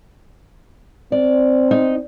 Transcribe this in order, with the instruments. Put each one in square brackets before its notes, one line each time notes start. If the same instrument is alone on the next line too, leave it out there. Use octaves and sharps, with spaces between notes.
[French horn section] C4 [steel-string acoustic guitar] D5
[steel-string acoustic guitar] D#4